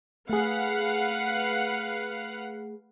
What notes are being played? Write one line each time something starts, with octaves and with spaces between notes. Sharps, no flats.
A3 G#4 B4 F5 F#5